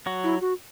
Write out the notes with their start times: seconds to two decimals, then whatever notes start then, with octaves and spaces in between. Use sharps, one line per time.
0.06 F#3 F#4
0.24 E4
0.41 F#4